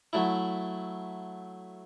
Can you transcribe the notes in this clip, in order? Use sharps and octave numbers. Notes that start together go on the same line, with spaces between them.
F#3 A3 E4